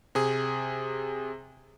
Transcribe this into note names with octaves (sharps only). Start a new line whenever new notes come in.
C3 G#4